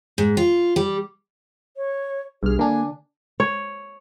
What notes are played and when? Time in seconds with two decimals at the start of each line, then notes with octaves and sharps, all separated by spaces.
0.18 G#2
0.37 F4
0.76 G3
1.77 C#5
2.43 B1 G2 G#4 F6
2.59 D3 A#3 D4 G#5
3.40 C#5